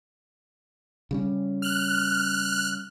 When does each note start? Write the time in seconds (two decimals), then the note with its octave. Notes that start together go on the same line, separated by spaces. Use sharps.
1.11 C#3 G3 C#4
1.62 F6 F#6